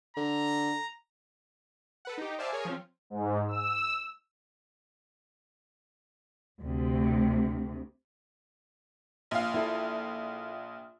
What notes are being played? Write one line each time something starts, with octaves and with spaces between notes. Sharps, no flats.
D3 A#5
A4 B4 F#5
D#4 G4
C5 D5 E5 F5 G#5 A5
G#4 A#4 C#5 G#5
F3 C4 C#4 F4
G#2
E6
D2 C3
A#1 F5
E4 F4 A4